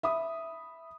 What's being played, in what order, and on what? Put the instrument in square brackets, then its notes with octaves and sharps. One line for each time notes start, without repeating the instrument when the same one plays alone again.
[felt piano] E5 B5 D#6